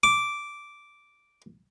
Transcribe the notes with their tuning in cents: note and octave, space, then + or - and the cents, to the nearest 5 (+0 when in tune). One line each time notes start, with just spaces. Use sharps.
D6 -5